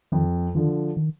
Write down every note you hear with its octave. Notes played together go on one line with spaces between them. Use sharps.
F2 D#3
D3 D#3 F3
D#3